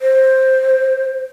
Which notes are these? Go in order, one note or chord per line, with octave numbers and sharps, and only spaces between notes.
C5